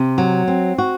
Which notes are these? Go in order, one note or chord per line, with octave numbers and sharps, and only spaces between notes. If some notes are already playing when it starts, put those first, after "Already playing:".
Already playing: C3
F#3
C4
F#4